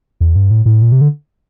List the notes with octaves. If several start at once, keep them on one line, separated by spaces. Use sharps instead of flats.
E2
G2
A2
A2
A#2
C3
D3